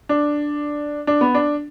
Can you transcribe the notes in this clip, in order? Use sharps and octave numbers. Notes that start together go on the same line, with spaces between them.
D4
D4
B3
D4